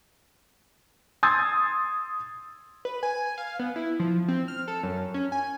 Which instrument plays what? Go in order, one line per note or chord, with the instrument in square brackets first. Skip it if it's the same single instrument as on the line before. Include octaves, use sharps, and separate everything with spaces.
[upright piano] C6 D#6 E6 G#6 A6
[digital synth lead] B4
G#5
F5
B3
E4
F3
C4
F6
A4
F#2
C#4
G#5